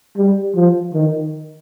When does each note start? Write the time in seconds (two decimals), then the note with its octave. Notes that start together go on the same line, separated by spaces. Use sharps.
0.17 G3
0.55 F3
0.94 D#3